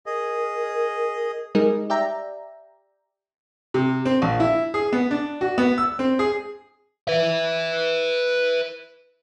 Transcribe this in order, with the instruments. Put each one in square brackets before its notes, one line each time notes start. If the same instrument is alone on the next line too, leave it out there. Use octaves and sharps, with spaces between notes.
[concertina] G#4 D#5 [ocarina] A#4
[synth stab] G3 G#3 D#4 G#4 A#4 D#5
G4 D5 E5 G5 A#5
[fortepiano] C3
C4
A#1
E4
G#4
B3
D4
F#4
B3
E6
C4
G#4
[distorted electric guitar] B4 E5